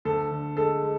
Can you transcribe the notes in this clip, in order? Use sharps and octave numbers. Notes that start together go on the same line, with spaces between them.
D2 A4
D3
G#3 A4
G#3